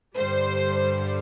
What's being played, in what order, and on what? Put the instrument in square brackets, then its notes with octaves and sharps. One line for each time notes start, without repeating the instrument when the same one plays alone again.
[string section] G2 D3 G3 C5